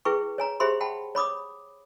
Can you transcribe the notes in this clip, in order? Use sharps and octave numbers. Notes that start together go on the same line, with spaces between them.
E4 G#4 B4 G5 C#6
C#5 G#5 A#5
G4 G#4 C5 E5 B5 C6
F#5 G5 A5 B5
C#5 B5 D6 D#6